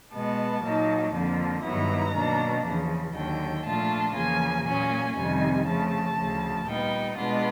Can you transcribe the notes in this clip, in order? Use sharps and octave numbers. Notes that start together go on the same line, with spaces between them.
B2 G#3 B3 A5
A#2 F#3 A#3 D#4
F2 D3 F3 A#3
G2 D#3 F#3 B3 E4 A#5
B2 F#3 A#3 D4
E2 C#3 F3
D#2 D3 F#3 G5
A#2 F3 A3 D4 F4 A5
E2 C#3 F3 A#3 G#5
A#2 F#3 A#3 C#4 G#5
F2 C3 D#3 G3 G#5
C#3 F3 A3 A5
D2 C#3 F3
A#2 G3 B3 D#4 G5
B2 G#3 B3 D4 F4 F#5